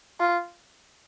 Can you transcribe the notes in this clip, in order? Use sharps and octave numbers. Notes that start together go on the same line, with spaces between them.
F4